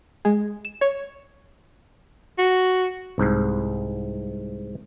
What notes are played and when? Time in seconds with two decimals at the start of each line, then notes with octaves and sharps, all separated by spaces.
0.25 G#3
0.65 E7
0.81 C#5
2.38 F#4
3.18 C2 G#2